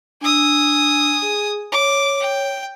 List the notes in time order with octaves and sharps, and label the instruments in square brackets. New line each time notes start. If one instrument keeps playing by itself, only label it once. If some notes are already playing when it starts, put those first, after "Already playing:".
[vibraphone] D4 E6 [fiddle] G#5 D#6
[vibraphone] G#4
[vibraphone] C#5 [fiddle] D6
[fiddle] G5